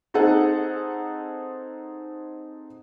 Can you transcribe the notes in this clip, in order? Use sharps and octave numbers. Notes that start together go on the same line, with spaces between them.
C4 D#4 G#4 A4 F#5